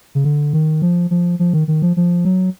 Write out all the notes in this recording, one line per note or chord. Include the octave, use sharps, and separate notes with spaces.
C#3
D3
D#3
F3
F3
F3
D#3
D#3
F3
F3
F#3